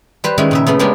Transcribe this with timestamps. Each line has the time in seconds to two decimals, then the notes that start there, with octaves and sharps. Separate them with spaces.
0.24 G3 B4 C5
0.38 D#3 G#3 C#4 E4
0.51 A#2 C#3 E5
0.66 C#3 A3 B3
0.79 G#3 B3 D4 G4 A#4